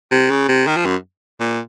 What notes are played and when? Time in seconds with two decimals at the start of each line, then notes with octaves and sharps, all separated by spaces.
0.12 C3
0.31 C#3
0.49 C3
0.67 D#3
0.76 F3
0.86 F#2
1.40 A#2